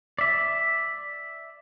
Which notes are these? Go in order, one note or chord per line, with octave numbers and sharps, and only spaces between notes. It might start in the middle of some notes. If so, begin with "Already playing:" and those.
D5 E5